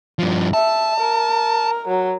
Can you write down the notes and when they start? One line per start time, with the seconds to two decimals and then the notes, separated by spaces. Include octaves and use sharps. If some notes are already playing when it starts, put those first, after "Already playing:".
0.19 G2 F3
0.54 E5 A5
1.00 A#4
1.88 F#3